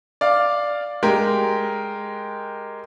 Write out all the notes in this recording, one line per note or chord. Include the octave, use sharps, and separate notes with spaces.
D5 F5
G#3 G4 A#4